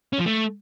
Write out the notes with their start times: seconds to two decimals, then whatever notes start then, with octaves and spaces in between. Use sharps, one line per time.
0.13 C#4
0.19 F3
0.26 A3